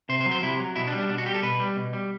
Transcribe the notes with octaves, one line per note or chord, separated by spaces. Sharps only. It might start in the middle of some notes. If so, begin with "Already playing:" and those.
C3 C5
C5
F#3
C5
C3 E4
F#3
B2 E4
D4
G3
D4
B2 D4
F#4
G3 G4
A4
B2 B4
G3
B2
G3